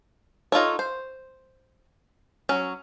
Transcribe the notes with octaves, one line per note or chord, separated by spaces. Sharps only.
D#4 F4 A4 C#5
C5
F#3 C#4